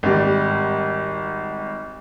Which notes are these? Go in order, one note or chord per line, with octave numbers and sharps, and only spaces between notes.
G#1 G3